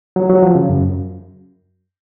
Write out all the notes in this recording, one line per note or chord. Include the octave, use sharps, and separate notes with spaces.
F#3
F#3
F3
C#3
F#2